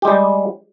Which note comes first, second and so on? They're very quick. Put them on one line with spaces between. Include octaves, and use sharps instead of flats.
G4 G#3 G3